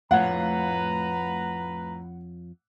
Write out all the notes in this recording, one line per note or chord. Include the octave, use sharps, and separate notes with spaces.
F2 A2 F4 B4 C#5 F5 F#5 A#5